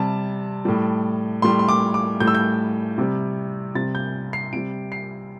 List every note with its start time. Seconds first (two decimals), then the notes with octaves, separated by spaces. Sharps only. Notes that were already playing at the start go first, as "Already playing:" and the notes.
Already playing: C3 G3 A5
0.65 A2 G3
1.42 A2 G3 C6
1.59 C6
1.69 D6
1.94 D6
2.20 A2 G3 G6
2.27 E6
2.35 G6
2.98 C3 G3
3.75 C3 G3 A6
3.95 G6
4.33 C7
4.53 C3 G3 D7
4.92 C7